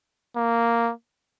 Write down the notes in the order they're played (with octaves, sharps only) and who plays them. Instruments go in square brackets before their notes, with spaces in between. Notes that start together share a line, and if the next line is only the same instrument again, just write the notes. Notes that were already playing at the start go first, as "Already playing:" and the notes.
[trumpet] A#3